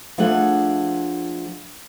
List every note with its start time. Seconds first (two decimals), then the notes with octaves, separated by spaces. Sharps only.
0.18 F3 A3 D4 G#4 F#5